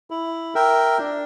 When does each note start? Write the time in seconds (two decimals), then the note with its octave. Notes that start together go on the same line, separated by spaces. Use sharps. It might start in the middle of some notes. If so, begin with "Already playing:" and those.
0.10 E4
0.55 A#4 E5 G5
0.99 D4